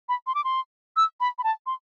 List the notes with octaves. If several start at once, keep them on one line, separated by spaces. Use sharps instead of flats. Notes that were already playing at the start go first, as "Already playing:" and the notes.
B5
C6
D6
C6
E6
B5
B5
A5
C6